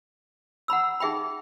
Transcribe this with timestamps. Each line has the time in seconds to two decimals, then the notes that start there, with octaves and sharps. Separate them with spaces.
0.68 F#5 A#5 B5 E6
1.00 D#4 G#4 E5 G5 B5